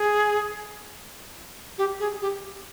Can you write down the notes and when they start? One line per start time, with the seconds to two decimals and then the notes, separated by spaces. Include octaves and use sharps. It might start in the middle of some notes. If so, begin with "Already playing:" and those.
Already playing: G#4
1.78 G4
2.00 G#4
2.21 G4